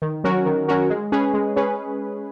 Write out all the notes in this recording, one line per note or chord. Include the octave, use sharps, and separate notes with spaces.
D#3
F#3 C#4 F#4 A#4
D#3
F#3 C#4 F#4 A#4
G#3
C#4 G#4 B4
G#3
C#4 G#4 B4